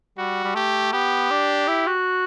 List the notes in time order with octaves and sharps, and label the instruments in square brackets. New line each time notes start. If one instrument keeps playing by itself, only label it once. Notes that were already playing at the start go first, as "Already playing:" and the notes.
[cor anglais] G3 [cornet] F#4
[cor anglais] G3
[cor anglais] A3 [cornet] G4
[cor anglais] B3 [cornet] G4
[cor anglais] D4
E4
F#4